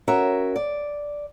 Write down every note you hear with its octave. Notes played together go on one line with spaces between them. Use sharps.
C#4 F#4 A#4 E5
D5